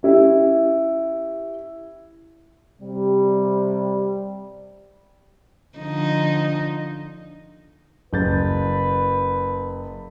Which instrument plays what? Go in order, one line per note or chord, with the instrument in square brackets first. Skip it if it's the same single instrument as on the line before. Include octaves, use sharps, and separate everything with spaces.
[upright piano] C#4 E4 G4
[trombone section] C3 G3
[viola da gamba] D3 F3 D#4
[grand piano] F#1 G6 A6 [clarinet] B4